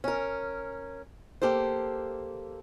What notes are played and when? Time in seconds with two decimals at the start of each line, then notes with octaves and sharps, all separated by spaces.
0.04 C#4 A#4
1.42 A#3 G4 A4 C5